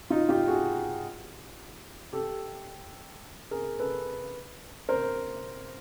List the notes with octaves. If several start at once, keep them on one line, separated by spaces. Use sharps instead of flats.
D#4 F4
F4 G4
F#4 G#4
G4 A4
G#4 A#4
A4 B4
A#4 C5